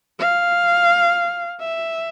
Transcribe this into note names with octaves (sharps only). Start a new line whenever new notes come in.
F5
E5